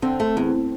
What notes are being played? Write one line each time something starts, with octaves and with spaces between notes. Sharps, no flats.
D3 C4
A3
E2